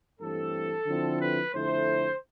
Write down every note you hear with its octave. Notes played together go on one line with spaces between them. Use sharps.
G2 E3 A3 C4 A4
D3 F3 C4 E4
B4
F2 D3 A3 E4 C5